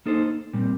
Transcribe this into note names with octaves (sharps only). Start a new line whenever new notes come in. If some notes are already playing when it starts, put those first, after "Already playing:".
A#3 D#4 A4 C5
A#2 G3 C4